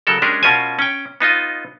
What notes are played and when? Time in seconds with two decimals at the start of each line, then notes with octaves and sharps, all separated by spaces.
0.07 C#3 F#3 A4 A#4
0.22 G#3 C#4 D4 G4 G#4 A#4
0.43 B2 C#4 F4 A#4 C5 G#5
0.79 C#4 G5
1.20 B3 D#4 F4 D#5